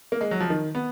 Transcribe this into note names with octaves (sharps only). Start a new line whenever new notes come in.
A#3
G#3
F#3
F3
D#3
B3